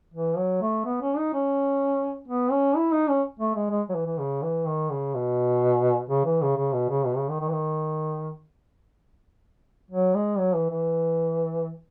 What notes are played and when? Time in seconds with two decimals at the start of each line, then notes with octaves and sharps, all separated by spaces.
0.14 E3
0.38 F#3
0.62 A3
0.85 B3
1.02 C#4
1.17 D#4
1.33 C#4
2.28 B3
2.52 C#4
2.76 E4
2.92 D#4
3.08 C#4
3.40 A3
3.55 G#3
3.71 G#3
3.89 F#3
3.95 E3
4.06 E3
4.19 C#3
4.43 E3
4.67 D#3
4.90 C#3
5.15 B2
6.10 C#3
6.25 E3
6.42 C#3
6.57 C#3
6.73 B2
6.89 C#3
7.05 B2
7.17 C#3
7.29 D#3
7.41 D#3
7.48 E3
7.53 D#3
9.91 F#3
10.15 G#3
10.39 F#3
10.55 E3
10.70 E3